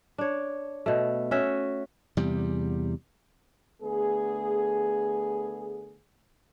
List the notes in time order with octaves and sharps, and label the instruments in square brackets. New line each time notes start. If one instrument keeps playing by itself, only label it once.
[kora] D4 C#5
B2 A3
C#4 F#4 E5
[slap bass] E2 C3 G3
[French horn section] D3 A3 B3 G#4